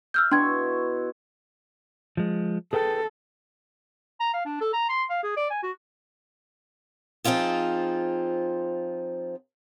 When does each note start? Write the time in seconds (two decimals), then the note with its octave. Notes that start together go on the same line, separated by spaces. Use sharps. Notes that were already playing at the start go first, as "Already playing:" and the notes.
0.14 E5 E6 F6 G6
0.32 B2 D4 E4 G5 C6 C#6 G#6
2.17 F3 G#3
2.73 G#4 A4 B4 G5
4.20 A#5
4.34 F5
4.46 D4
4.61 A4
4.73 A#5
4.89 C6
5.10 F5
5.23 G#4
5.37 D5
5.50 G#5
5.63 F#4
7.24 F3 C4 D#4 F4 G#4